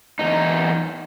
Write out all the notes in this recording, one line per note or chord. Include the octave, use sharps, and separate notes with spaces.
E2 G2 D#4